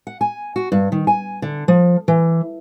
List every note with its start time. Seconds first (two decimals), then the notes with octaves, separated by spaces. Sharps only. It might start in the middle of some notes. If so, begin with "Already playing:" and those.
0.07 F#5
0.21 G#5
0.56 F#4
0.72 G2
0.92 D#3
1.07 G#5
1.42 D3
1.68 F3
2.08 E3